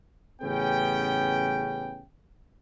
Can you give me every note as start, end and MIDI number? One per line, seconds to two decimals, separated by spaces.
0.42 2.03 33
0.42 2.03 49
0.42 2.03 59
0.42 2.03 61
0.42 2.03 68
0.42 2.03 79